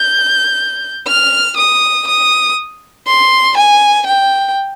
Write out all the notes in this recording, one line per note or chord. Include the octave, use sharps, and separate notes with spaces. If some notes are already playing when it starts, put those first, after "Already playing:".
Already playing: G6
F6
D#6
D#6
C6
G#5
G5